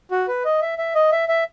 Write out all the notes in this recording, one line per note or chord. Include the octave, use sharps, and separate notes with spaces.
F#4
B4
D#5
E5
E5
D#5
E5
E5